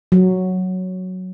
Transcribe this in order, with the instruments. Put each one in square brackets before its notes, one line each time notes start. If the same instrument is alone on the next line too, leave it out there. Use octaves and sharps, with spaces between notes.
[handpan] F#3